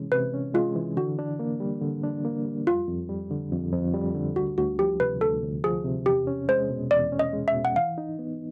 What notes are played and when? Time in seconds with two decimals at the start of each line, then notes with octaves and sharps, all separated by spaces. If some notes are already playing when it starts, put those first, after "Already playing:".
Already playing: C3 E3 G#3 C#4
0.12 C3 B4
0.34 C#4
0.54 G#3 F4
0.75 E3
0.97 D3 F#4
1.19 D4
1.39 A#3
1.60 G3
1.81 D3
2.03 D4
2.25 A#3
2.46 G3
2.67 F2 F4
2.88 F2
3.09 G3
3.31 D3
3.52 F2
3.72 F2
3.94 G3
4.15 D3
4.36 D2 F#4
4.58 D2 F#4
4.79 F3 G4
5.00 C3 B4
5.21 D2 A4
5.43 D2
5.64 F3 G#4
5.85 C3
6.06 E2 G4
6.27 C#4
6.49 G#3 C5
6.70 B2
6.91 E2 D5
7.12 C#4
7.19 D#5
7.33 G#3
7.48 E5
7.55 B2
7.65 F#5
7.76 E3 F5
7.98 D#4
8.19 B3